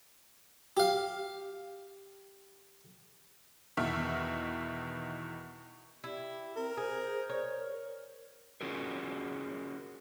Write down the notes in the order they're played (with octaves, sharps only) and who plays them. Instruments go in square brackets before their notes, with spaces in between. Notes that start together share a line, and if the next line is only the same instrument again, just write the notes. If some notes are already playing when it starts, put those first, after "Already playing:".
[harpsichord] G4 F5
[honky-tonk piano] E2 B2 D#3 E5 F6
[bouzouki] E4 [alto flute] G4
[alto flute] C4 [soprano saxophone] A#4
[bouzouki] G#4 [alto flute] C5
[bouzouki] C#5
[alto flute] A#4
[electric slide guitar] C#4 F4 F#4 G#4 A#4